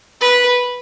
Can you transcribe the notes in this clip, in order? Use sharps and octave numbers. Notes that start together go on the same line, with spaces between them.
B4